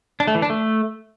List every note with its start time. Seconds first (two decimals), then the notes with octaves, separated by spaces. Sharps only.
0.20 D4
0.27 A3
0.35 E3
0.42 D4
0.50 A3